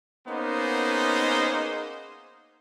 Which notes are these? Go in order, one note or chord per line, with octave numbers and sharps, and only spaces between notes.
A#3 B3 C#4 D#4 G#4 C5